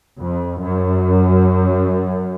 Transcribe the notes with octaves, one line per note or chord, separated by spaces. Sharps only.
F2
F#2